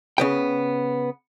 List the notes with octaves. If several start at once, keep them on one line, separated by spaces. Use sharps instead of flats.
C#3 B3 G5